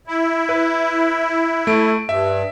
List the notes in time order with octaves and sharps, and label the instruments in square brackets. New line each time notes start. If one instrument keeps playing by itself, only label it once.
[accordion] E4
[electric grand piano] B4
A3 D7
[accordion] G2 [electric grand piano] E5